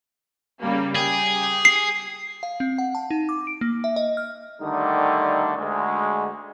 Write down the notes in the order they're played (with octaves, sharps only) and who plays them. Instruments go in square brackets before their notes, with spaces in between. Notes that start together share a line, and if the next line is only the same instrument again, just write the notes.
[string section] C#3 G3 A#3
[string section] G4 [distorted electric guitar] G#4
[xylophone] C7
[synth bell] F5
C4
F#5
A5
D#4
D6
D7
A#3
E5
D#5
F6
[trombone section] D3 D#3 G3 A3 D#4
D2 G#3